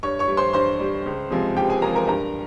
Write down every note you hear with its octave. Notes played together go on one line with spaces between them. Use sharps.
G2 C#5 C#6
C#5 C#6
G3
C5 C6
G2 C5 C6
G3
C#2
C3 F3 G#3
C#2 G4 G5
G#4 G#5
C3 F3 G#3 A#4 A#5
A#4 A#5
G2 A#4 A#5